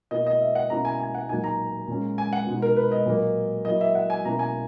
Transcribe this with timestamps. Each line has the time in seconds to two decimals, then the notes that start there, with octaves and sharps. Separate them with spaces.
0.11 B2 A#3 E4 D#5
0.27 D#5
0.41 E5
0.55 F#5
0.70 B2 A#3 C#4 E4 A#5
0.85 G#5
1.00 G#5
1.15 F#5
1.29 A#2 F#3 A#3 D#4 G#5
1.44 A#5
1.88 A#2 G#3 C#4
2.18 G#5
2.33 F#5
2.47 B2 G#3 D#4
2.62 A#4
2.76 B4
2.92 D#5
3.06 A#2 F#3 A#3
3.65 F#3 A#3 E4 D#5
3.81 E5
3.95 F#5
4.10 G#5
4.25 B2 A#3 C#4 E4 A#5
4.39 G#5